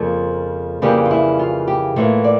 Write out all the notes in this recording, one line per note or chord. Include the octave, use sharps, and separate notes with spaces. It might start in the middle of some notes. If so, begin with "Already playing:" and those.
Already playing: F2 C#3 F3 A#3
F2 C#3 E3 G3 A#3 G4
F4
E4
F4
G4
A2 E3 G3 A#3 F4
D5